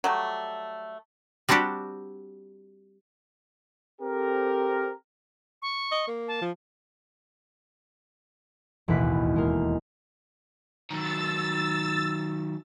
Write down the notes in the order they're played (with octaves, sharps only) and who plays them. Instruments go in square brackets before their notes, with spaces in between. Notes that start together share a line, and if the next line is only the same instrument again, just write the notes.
[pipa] F#3 G3 A3
[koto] G3 C4 D4 F#4 G4
[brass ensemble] C4 G4 A4 A#4
[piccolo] C#6
[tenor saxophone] D#5
A#3
[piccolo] A5
[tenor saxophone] F3
[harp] E1 A1 D#2 B4 B6
G#3 A#4
[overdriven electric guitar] D#3 F#3 [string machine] E6 A6